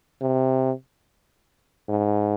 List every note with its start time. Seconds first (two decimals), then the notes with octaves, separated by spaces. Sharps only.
0.21 C3
1.89 G#2